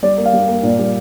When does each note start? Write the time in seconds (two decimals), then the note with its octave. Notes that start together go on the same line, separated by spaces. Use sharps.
0.02 G3 D5
0.18 A#3
0.25 F5
0.33 G3
0.48 A#3
0.63 A#2
0.78 G3